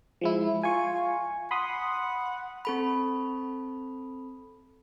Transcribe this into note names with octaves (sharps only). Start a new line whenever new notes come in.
F3 G#3 E4
F4 G#5 C#6
F#5 B5 C6 D#6
C4 A4 B5